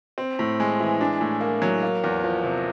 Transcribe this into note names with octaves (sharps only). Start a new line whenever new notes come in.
C4
A2
G#3
E3
D4
A2
A#3
F#3
A#3
E2
F3
C3